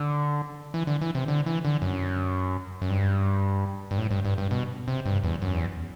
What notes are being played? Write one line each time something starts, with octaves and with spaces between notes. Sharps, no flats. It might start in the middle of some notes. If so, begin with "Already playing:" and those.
Already playing: D3
E3
D3
E3
C3
D3
E3
D3
F#2
F#2
G2
G2
A2
G2
G2
G2
B2
C3
G2
E2
F#2
E2